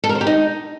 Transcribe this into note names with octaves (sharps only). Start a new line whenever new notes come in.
A4
A#4
C5
G4
D#4